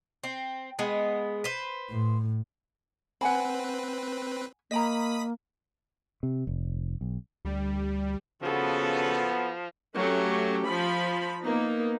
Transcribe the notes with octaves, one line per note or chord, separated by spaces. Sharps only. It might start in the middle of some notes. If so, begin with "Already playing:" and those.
C4
G#3 B3
B4 C5
A2
C4 B4 F#5 G#5 B5
A#3 D#5 G5 A#5 B5 D#6 B6
C3
F1
B1
D2 G3
C#3 F3 B3 F#4 A4
F#3 A3 C#4 G4
F3 B5
A#3 B3 D#4